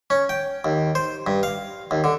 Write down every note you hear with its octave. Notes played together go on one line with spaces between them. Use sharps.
C#4
G5
D#2
C5
G2
F5
D#2
D3